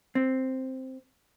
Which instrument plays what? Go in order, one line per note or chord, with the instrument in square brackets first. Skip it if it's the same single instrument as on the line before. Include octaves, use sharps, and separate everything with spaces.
[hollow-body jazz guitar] C4